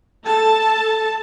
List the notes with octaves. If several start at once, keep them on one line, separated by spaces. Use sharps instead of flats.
A4 A5